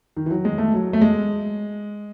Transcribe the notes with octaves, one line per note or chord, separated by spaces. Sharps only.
D#3
E3
F#3
G#3
A3
F#3
A3
G#3